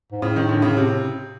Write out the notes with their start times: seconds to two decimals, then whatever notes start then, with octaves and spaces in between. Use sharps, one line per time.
0.12 G#2
0.22 A2 C#3
0.36 D#3
0.49 D3
0.62 C#3
0.76 C3